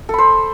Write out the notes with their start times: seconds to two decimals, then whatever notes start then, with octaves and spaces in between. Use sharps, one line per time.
0.09 A4
0.14 B5
0.18 C5